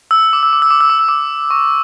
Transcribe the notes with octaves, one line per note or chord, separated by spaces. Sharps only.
E6
D6
E6
D6
E6
D6
E6
D6
E6
D6
C#6